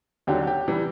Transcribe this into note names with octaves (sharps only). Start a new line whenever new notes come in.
D#2 D3 F#3 G4
G4
C3 E3 G3